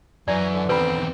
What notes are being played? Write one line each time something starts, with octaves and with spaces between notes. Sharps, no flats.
F#2 E3 D5 G#5 A#5
D3
E2 D#3 C4 B4 B5